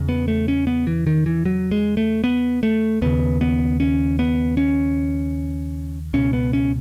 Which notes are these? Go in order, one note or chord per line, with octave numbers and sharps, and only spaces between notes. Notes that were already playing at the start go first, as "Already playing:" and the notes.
Already playing: E2 C#3
B3
A3
C#4
B3
E3
D#3
E3
F#3
G#3
A3
B3
A3
D#2 C#3 B3
B3
C#4
B3
C#4
C#2 B2 C#4
B3
C#4